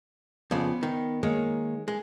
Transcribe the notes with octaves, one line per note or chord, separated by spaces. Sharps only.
F2 C#3 B3 C5 D5
D#3
D#3 G#3 A#3 C#5
G#3